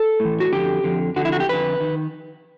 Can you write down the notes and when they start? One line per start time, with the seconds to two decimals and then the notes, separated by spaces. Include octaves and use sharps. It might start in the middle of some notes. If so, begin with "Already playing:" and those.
Already playing: A4
0.20 A2 E3
0.40 F#4
0.52 F2 D3 G4
0.84 F2 D3
1.16 F2 D3 F#4
1.25 E4
1.32 F#4
1.40 G4
1.49 F2 D3 B4
1.80 D#3